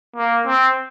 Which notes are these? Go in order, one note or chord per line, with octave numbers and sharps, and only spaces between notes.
A#3
C4